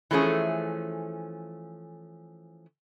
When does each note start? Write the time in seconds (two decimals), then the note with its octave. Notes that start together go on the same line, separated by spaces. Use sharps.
0.11 E3 F3 A3 C#4 G#4